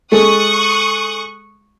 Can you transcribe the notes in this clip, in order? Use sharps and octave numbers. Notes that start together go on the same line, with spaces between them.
G#3 A4 C#6 D#6 F#6